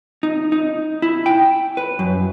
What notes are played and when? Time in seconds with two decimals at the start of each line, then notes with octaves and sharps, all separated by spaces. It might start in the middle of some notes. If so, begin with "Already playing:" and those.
0.23 D#4
0.52 D#4
1.02 E4
1.26 G5
1.77 B4
1.99 F#2